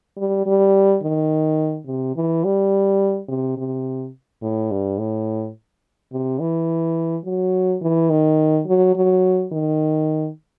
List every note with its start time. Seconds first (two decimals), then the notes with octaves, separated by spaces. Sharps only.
0.17 G3
0.46 G3
1.03 D#3
1.87 C3
2.16 E3
2.44 G3
3.29 C3
3.58 C3
4.42 A2
4.71 G2
4.99 A2
6.12 C3
6.40 E3
7.25 F#3
7.82 E3
8.10 D#3
8.67 F#3
8.95 F#3
9.52 D#3